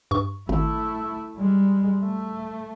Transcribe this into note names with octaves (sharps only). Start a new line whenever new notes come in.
G2 C#6
G#1 A3 E4
G3 G#3
A3